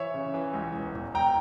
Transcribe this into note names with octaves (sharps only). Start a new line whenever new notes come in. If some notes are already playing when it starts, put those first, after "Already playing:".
Already playing: E3 C#5 E5
C#3
E3
C#2
E1
E2
E1 G5 A#5